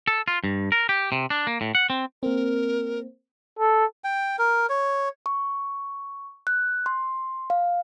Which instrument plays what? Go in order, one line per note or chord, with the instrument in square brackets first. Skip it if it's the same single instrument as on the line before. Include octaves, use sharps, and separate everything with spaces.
[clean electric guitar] A4
F4
G2
A#4
G4
C3
D4
A#3
A2
F#5
C4
[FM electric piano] A#3 C4 [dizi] A#4
[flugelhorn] A4
[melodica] G5
A#4
C#5
[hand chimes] C#6
F#6
C6
F5